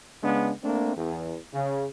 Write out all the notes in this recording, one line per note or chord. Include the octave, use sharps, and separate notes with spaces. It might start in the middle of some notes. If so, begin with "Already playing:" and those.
C#3 G#3 B3 D4
A3 A#3 C4 D4
E2
C#3